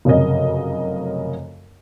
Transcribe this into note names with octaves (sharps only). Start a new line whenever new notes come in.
F1 F#2 C#3 A#4 D#5